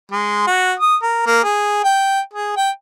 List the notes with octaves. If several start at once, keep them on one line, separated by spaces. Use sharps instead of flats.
G#3
F#4
D#6
A#4
A#3
G#4
G5
G#4
G5